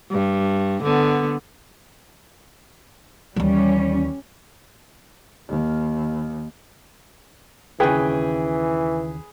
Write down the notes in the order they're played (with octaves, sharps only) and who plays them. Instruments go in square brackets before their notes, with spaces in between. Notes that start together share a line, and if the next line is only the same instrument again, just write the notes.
[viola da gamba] G2
D3 B3
[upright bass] D#2 E3 [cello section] G3 C#4
[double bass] D#2
[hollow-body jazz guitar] D#2 C#3 [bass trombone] E3 [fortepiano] G#4 B4 G5